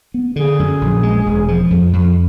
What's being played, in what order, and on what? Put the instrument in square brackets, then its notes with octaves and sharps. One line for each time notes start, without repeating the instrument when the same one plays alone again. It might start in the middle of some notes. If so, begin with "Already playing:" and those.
[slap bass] B3
[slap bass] D3 [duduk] G#4
[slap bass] F#2
A#1
G#3
E1
F3
F2
F2